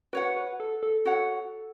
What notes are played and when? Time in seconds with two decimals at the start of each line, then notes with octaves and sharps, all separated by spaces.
0.13 F#4 B4 C#5 F#5
0.37 B4
0.60 A4
0.83 A4
1.05 F#4 C#5 F#5